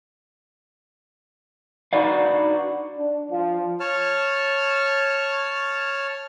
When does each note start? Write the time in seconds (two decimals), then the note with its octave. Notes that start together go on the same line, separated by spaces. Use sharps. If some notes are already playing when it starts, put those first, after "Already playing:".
1.93 D4 D#4 F#4 B4 D5 F5
2.97 D4
3.31 F3
3.80 C#5 A5 F6